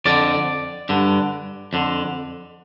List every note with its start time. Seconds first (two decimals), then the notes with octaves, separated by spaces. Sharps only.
0.05 F2 D3 D5
0.89 G2 D3
1.73 F2 D3